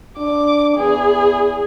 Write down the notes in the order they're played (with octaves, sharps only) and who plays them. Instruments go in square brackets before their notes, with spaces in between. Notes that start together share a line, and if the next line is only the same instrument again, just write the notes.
[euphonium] D4 [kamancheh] D6
[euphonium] E2 [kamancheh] G#4